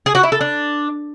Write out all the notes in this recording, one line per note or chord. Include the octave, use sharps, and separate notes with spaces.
G#4
F#4
E4
A4
D4